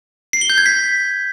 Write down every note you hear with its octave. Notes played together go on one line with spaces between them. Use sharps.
C7
G7
G6
G#6
B6